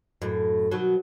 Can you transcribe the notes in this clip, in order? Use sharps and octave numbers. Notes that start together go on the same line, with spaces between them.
F#2 A2
B2 D#3 F#3